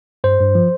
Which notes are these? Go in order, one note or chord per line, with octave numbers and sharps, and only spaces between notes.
G2 C5
G2
F3